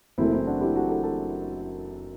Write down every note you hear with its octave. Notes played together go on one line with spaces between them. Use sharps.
F#1 F#2 E3 A3 C4 E4
C4 E4
D4 F#4
E4 G4
F#4 A4
F#4 A4
F#4 A4